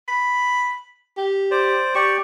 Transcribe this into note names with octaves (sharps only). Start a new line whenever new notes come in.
B5
G4
C5 D5
G4 D5 C#6